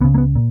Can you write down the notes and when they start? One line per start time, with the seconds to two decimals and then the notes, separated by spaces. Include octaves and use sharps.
0.01 C#2 B3
0.04 C#3
0.14 A#3
0.18 B3
0.35 A#2